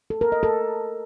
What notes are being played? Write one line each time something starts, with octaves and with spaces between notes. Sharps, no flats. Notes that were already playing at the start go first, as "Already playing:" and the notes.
A4
A#4
D#5
A4